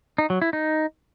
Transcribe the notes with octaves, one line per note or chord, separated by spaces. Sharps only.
D#4
F#3
E4
D#4